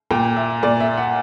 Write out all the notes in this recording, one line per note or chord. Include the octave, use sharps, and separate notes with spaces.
A#2 G5
E5
A#2 D5
E5
F#5